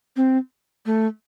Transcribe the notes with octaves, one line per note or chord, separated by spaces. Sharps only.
C4
A3